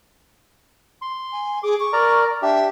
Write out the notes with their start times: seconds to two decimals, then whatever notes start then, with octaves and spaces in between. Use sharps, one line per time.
1.02 C6
1.32 G#5
1.63 G#4 D6
1.80 C#6
1.93 A#4 D5 A#5
2.42 D4 G4 E5